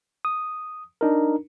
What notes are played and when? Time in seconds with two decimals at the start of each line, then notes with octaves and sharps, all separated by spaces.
0.25 D#6
1.01 D4 D#4 A#4